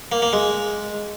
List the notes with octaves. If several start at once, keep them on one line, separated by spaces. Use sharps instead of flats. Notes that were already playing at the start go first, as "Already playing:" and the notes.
A#3
A#3
G#3